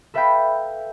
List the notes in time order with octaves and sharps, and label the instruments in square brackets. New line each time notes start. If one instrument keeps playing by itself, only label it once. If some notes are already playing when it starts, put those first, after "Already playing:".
[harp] A4 B4 E5 F5 G5 B5